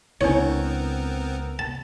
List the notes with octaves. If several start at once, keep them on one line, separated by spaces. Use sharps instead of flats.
C#2 B3 C4 D4 E4 A#4 C#5
A5